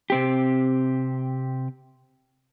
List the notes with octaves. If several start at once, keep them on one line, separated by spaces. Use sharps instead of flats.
C3 C4 G4